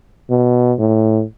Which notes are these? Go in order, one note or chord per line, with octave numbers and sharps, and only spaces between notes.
B2
A2